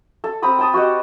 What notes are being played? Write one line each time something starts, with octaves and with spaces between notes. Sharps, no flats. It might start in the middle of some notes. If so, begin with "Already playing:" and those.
A4
C4 A#5 B5 D#6
G5 A5 D#6
F#4 G4 D#5